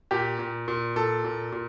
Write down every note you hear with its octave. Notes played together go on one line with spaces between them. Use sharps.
A#2 G4
A#2
A#2
A#2 A4
A#2
A#2